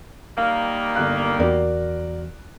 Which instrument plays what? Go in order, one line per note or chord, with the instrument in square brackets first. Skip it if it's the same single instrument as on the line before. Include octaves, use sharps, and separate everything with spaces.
[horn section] D#3 G3 A#3 [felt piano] F5
[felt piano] G1 F#6
[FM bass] E2 [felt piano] F#4 A#4 D5